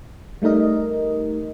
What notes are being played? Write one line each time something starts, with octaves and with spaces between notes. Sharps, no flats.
G3 A3 D#4 A#4 D#5